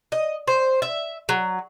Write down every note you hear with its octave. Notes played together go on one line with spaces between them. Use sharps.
D#5
C5
E5
F#3